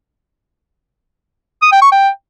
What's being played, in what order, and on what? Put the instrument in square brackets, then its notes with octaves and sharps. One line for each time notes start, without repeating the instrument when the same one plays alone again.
[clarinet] D#6
G5
C#6
G5